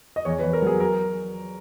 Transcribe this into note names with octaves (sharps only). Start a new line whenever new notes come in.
D#5
E2 C#5
E2 B4
A#4
F#3 G#4
A#4